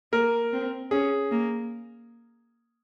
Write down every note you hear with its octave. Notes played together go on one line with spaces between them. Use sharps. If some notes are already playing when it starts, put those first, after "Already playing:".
A#3 A#4
C4
C#4 G#4
A#3